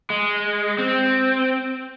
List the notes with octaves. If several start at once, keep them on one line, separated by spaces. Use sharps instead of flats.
G#3
C4